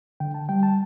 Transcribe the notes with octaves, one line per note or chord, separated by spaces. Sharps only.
D3 G5
A5
G3 G5
A5